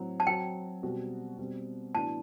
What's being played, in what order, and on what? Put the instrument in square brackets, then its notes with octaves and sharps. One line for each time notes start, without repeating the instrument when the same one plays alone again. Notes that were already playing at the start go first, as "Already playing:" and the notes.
Already playing: [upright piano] A2 F#3 C4
[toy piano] A5
[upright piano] F#3 C4 F#4 [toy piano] G5
[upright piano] B2 G3 C4 F#4
B2 G3 C4
[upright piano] A2 E3 B3 D4 F#4 [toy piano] A5